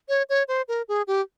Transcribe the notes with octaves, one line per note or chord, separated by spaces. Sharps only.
C#5
C#5
C5
A#4
G#4
G4